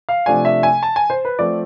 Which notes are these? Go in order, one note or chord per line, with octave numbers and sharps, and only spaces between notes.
F5
C3 F3 A3 D4 G#5
E5
G#5
A5
G#5
C5
B4
F3 A3 C4 D5